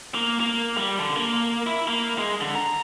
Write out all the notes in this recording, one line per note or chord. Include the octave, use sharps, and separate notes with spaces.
A#3
A#3
G3
D3
A#3
E4
A#3
G#3
D3
A#5